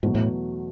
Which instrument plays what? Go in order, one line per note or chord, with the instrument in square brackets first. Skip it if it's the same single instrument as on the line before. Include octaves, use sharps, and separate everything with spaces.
[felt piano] E2 B2 F#3 A3 [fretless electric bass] G#2
[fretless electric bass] A2